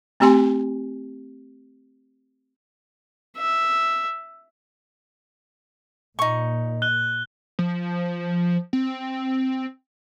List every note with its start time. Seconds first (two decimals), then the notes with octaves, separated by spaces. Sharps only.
0.20 A3 C4 G4 G#5 C6
3.38 E5
6.19 A#2 D#4 C#6
6.82 F#6 G7
7.59 F3
8.73 C4